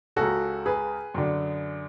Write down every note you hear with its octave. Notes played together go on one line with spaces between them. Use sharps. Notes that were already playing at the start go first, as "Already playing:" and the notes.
C#2 C#3 F#4 A4
G#4 B4
F#2 D3